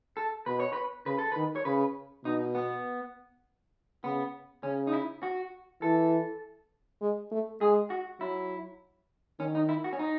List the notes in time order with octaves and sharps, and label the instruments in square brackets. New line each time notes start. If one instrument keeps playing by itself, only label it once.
[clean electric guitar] A4
[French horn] B2 [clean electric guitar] B4
[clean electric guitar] C#5
B4
[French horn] C#3 [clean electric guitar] B4
[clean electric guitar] A4
[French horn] D#3 [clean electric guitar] B4
[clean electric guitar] C#5
[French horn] C#3 [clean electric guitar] B4
[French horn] B2 [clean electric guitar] D#4
[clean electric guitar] B3
[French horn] C#3 [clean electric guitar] B3
[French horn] C#3 [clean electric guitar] C#4
[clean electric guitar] D#4
E4
F#4
[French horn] E3 [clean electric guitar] A4
[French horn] G#3
A3
[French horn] G#3 [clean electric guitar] G#4
[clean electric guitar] F#4
[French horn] F#3 [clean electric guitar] E4
[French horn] D#3 [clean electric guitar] C#4
[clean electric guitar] D#4
E4
F#4
C#4
D#4